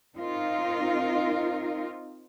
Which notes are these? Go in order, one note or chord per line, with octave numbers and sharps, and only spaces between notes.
C4 D#4 F4 A#4